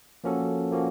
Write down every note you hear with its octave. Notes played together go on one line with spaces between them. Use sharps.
F3 A#3 C#4 F#4 A4
F3 A#3 C#4 F#4